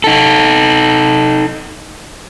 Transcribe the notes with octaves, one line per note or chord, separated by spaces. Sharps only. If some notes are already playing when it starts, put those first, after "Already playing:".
D#4 A4